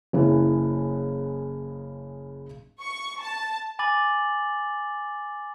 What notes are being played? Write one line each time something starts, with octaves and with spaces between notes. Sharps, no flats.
F#1 C#3 E3
C#6
A5
G#5 B5 D6 A6 F#7